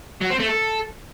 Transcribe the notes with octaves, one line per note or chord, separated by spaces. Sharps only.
F#3
C4
A3
A4